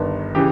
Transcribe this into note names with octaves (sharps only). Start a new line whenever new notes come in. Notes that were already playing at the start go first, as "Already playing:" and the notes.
Already playing: G1 G2 D#3
C#3 E3 G4